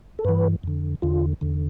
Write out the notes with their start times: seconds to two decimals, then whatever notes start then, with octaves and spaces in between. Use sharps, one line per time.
0.19 A4
0.25 G2 E3 B4
0.64 F2 D3
1.02 E2 D3 F4
1.41 E2 D3